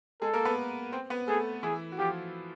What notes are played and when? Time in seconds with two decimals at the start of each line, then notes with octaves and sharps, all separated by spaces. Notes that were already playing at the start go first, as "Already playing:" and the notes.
0.22 G#3 G#4 A4
0.34 A#3 A#4
0.45 B3 B4
0.92 C4 C5
1.10 B3 B4
1.28 A3 G#4 A4
1.63 E3 E4 G#4
1.92 F#4
1.99 F3 F4 G4